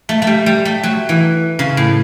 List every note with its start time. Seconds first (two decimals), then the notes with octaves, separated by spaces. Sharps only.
0.09 A3
0.22 A3
0.27 G3
0.46 G3
0.65 A3
0.83 F#3
1.09 E3
1.59 C#3
1.77 A2